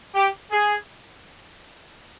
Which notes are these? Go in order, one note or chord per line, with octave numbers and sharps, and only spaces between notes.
G4
G#4